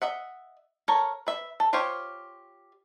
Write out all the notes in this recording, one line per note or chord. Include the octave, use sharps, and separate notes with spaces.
D#5 E5 F#5
A4 A#4 C#5
B4 E5
A4
F4 G4 C5 C#5 F5